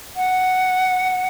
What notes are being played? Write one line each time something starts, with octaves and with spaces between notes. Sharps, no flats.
F#5